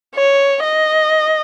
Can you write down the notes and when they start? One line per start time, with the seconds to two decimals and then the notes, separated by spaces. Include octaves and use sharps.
0.15 C#5
0.63 D#5